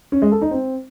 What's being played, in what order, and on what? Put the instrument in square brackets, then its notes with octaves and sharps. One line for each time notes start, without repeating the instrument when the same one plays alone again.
[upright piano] C#4
G#3
A4
D#4
C4